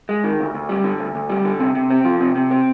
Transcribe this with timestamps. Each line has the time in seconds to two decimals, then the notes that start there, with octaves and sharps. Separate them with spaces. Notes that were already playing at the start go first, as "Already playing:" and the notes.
0.09 G#3
0.24 D#3
0.40 D2
0.54 D2
0.69 G3
0.84 D3
0.99 D2
1.15 D2
1.30 G3
1.45 D3
1.59 C3
1.75 C3
1.90 C4
2.05 F3
2.20 C3
2.36 C3
2.51 C4